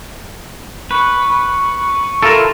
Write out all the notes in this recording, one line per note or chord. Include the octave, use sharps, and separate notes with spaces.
B4 C#6
E4 F4 A4 A#4